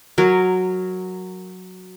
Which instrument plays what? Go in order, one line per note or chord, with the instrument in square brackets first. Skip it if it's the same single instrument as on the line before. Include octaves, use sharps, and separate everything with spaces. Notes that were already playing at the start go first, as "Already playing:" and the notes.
[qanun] F#3 A#4